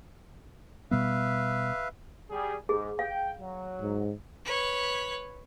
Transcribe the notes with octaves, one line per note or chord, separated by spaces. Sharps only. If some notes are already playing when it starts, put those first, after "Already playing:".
B2 G3 B3 B4 E5 F5
G3 G#4
G#2 G#4
F5 G5
F#3
G#2
B4 C#5